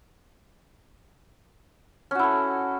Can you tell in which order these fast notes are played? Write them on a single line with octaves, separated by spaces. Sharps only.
C#4 F#4 E4 A4